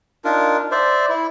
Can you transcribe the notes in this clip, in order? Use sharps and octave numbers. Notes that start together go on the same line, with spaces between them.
D4 D#4 F4 A#4
C5 D5 E5
E4